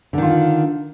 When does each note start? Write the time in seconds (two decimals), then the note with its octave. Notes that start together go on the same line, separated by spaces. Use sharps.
0.13 D3
0.18 D#3
0.23 F4